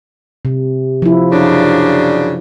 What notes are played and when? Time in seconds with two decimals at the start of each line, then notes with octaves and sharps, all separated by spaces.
0.45 C3
1.02 F3 E4
1.32 F#2 C#3 D4